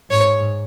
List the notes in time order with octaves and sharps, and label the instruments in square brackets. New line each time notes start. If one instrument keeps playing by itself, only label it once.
[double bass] G#2 [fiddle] C#5